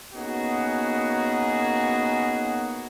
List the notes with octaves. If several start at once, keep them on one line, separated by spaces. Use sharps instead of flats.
A#3 B3 C#4 D#4 F#4 G#4